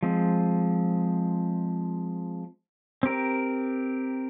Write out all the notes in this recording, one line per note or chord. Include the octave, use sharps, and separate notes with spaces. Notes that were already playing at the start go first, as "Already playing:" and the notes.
F3 G#3 C4
C4 G4 A#4